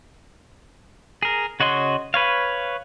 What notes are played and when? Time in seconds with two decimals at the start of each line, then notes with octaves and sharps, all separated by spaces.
1.23 G#4 A#4
1.60 C#3 F#4 C#5 D#5 C6
2.14 B4 C#5 F5